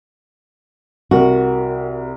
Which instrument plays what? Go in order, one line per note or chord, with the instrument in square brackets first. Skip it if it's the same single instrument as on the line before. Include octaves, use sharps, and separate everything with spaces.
[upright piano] C2 A#4 [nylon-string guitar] F#4